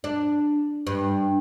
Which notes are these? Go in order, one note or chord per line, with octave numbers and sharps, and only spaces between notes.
D4
G2